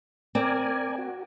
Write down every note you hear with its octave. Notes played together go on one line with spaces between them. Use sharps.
C4 A#4 D5 G#5
F#4